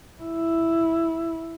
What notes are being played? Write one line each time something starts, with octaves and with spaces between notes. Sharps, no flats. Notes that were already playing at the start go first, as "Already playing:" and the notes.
E4